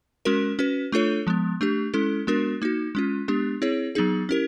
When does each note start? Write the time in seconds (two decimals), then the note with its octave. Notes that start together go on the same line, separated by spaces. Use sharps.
0.25 G#3 C#4 F#4 A#4
0.59 C#4 F#4 B4
0.92 A3 D4 F4 A4 C#5
1.27 F3 G#3 B3
1.61 A3 D4 G4
1.94 G#3 C#4 E4 A4
2.27 G#3 B3 D4 F#4 A#4
2.62 A#3 D#4 F#4
2.95 G#3 C#4 F4
3.28 G#3 B3 D4 G4
3.62 C4 E4 G#4 C#5
3.95 F#3 B3 D#4 G#4
4.29 C#4 E4 G4 A#4